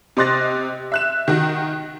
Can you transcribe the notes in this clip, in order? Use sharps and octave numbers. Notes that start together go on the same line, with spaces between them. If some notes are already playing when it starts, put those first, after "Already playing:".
C3 D#5 C6 F#6 A6 A#6
E5 F#6 E7
D#3 F#4